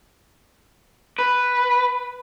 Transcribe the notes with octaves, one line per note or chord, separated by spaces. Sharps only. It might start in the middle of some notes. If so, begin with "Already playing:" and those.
B4